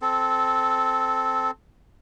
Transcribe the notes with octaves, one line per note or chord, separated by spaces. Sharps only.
C4 A4